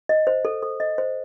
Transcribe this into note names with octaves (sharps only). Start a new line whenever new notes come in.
D#5
C5
A4
A4
D#5
C5